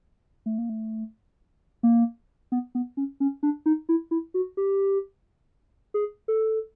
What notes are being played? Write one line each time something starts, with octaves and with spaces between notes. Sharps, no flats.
A3
A#3
A3
A#3
B3
B3
C#4
C#4
D4
D#4
E4
E4
F#4
G4
G#4
A4